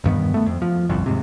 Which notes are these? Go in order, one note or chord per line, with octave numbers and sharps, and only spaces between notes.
E1 G2 D#3 B3
A3 B3
F2
F3
G1 C2 F2
D#2 G#2 C3